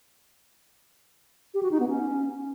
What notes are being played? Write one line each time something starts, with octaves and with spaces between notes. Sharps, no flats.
G4
F#4
D#4
B3
C#4